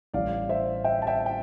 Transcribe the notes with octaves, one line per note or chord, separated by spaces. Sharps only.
A1 A2 G3 D5 F5
C5 E5
E5 G5
A5
E5 G5
G5